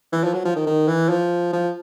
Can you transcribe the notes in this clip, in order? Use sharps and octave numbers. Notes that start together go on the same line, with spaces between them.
E3
F3
F#3
F3
D#3
D#3
E3
F3
F3